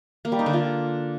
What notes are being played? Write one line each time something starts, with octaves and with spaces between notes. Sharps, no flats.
A#3
G3
D#4
D3
F4